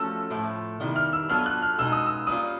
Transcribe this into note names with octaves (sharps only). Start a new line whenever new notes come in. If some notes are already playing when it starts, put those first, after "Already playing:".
Already playing: F3 A3 C#4 F#4 A4 E6
A2 F3 A3
C3 D#3 G3 B3 E4
F6
E6
F#3 B3 D4 F4 A4 F6
F#6
F6
B2 G#3 B3 D#4 E6
D#6
E6
G3 A#3 C#4 F4 D#6